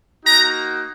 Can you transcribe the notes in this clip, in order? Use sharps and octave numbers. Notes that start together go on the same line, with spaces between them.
A#3 D#4 F#4 A#5